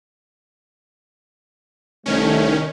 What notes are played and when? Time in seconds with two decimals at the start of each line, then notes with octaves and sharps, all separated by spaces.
2.06 C2 D#3 A3 C#4